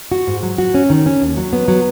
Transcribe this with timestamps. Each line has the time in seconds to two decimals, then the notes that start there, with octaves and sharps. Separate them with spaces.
0.12 F#4
0.27 G#2
0.43 F#3
0.58 F#4
0.74 C#4
0.90 D#3
1.06 C#4
1.22 D#2
1.37 F#3
1.53 B3
1.68 F#3